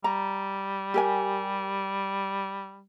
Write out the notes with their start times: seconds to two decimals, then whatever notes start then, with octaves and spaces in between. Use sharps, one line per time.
0.04 G3 A#5
0.94 G4 A#4 G#5